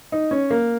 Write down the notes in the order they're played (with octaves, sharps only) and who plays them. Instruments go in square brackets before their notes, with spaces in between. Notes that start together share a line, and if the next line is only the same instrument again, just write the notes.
[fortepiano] D#4
C#4
A#3